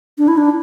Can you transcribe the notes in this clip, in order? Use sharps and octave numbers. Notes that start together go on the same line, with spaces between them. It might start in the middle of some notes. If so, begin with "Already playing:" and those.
D4
E4
D4